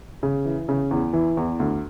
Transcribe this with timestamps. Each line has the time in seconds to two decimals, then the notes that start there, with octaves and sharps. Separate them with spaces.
0.23 C#3
0.45 E3
0.69 C#3
0.91 E2
1.13 E3
1.37 E2
1.60 D2